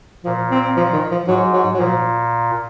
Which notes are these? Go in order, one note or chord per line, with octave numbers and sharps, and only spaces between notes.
A#2 F3
C4
F3
D#3
F3
G#2 F#3
F#3
F#3
A#2 F3